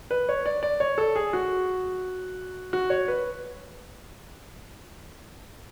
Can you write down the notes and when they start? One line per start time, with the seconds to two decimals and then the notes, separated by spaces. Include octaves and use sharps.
0.11 B4
0.29 C#5
0.46 D5
0.63 D5
0.80 C#5
0.98 A4
1.15 G#4
1.33 F#4
2.73 F#4
2.90 C#5
3.08 B4